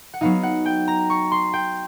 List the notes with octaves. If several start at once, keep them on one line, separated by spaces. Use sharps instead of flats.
F#5
F#3 B3 D#4 F5
F#5
G5
A#5
C#6
C6
G5